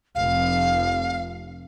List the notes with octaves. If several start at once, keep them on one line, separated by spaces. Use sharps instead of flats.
F1 F5